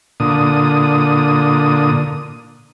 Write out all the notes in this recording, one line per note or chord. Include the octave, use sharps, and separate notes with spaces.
A#2 D3 D#6